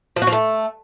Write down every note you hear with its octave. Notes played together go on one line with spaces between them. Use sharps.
F3
F#4
F3
A3